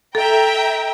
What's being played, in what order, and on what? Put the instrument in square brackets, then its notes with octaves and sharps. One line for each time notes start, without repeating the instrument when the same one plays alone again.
[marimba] A4 [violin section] E5 G5 A#5